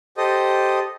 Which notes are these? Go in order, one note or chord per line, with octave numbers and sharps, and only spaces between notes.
G4 A4 C5 D#5 D#6